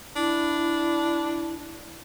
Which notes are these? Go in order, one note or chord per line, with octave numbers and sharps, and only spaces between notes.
D4 E4